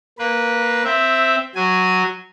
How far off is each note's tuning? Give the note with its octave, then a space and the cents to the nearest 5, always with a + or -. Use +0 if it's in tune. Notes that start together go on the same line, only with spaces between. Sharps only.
A#3 +0 B4 -15
C4 +0 E5 +0
F#3 +0 G#5 +5